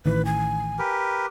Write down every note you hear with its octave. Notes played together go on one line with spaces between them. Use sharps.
A1 D#3 E3 B4
G#5
G4 A#4 B4